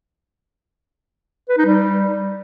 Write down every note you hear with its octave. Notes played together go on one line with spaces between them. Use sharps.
B4
D#4
G3